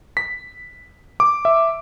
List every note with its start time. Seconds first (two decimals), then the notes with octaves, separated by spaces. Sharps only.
0.17 B6
1.20 D6
1.45 E5